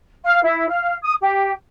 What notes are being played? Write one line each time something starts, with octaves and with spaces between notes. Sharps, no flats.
F5
E4
F5
D#6
G4